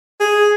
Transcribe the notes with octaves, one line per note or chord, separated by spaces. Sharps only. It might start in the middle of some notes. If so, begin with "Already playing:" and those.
G#4